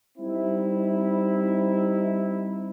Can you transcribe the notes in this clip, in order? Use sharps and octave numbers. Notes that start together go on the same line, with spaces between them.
G3 C4 D#4 E4